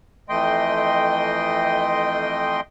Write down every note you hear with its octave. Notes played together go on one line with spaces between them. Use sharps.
F2 E3 A3 D#5 G5 C6